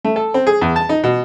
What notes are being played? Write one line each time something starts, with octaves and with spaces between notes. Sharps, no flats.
A3
A4
C4
G#4
E2
A5
D#4
B2